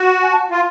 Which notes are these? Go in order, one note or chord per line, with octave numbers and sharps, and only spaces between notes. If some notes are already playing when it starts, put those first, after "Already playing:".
Already playing: F#4
G#5
A5
F#5
F4 F5